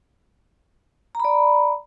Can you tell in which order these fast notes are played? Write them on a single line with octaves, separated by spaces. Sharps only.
A#5 B5 D5